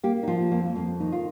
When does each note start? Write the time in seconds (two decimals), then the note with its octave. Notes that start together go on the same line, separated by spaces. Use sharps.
0.04 A#3 G4
0.23 D#4
0.27 F3 F4
0.52 F2 A#3
0.65 A#3
0.76 F2 C4
1.00 D#3 D#4
1.12 F4